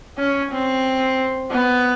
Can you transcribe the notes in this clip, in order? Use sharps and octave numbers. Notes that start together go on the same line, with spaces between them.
C#4
C4
B3